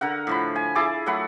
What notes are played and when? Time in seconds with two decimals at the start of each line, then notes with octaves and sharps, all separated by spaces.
0.01 D3 A#4 F#5
0.27 A2 F3 B5
0.56 G#5
0.75 E4 G#4 A5 D6
1.06 F#3 A3 F#5 B5